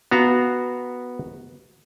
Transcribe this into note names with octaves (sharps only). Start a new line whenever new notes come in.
B3 F#4 F5 A#5